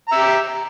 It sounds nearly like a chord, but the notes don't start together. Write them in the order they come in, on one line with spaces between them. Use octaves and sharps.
A#5 E5 G4